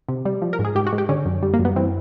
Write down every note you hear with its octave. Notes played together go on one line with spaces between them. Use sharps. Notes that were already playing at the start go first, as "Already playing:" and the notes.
C3
G3
F3
A#4
G#2
G#4
G#2 G4
F#4
G#2
G4
D3 C#4
F#2
G3
A#3
F#2
B3
E3 C4